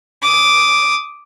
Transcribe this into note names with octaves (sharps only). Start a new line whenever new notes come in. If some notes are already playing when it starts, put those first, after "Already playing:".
D6 D#6